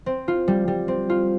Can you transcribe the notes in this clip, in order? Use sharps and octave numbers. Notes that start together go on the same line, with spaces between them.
C4
F4
G3
G3
C4
F4